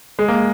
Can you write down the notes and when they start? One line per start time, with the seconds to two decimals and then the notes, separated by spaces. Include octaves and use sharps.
0.19 G#3
0.28 A#3